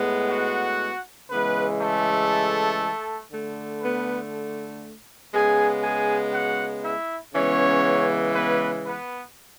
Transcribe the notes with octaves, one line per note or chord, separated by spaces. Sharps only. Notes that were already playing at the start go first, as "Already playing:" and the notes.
Already playing: A2 G#3 B3
F#4 F#5
C#3 E3 G#3 B3 B4
A3 A4
D3 A3
B3 B4
C#3 G#3 B3 G#4 G#5
G#4 G#5
F#4 F#5
E4 E5
C#3 E3 G#3 B3 C#4 C#5
B3 B4
B3 B4